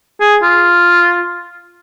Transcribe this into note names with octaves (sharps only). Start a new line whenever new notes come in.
G#4
F4